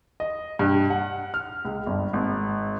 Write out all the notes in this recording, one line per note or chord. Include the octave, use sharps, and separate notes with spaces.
D#5
G2
F#5
F6
C#2
G1
G#1